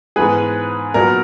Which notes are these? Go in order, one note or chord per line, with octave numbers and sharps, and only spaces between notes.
G#2 E3 G#3 B3 G#4 B4
A#2 F#3 B3 A#4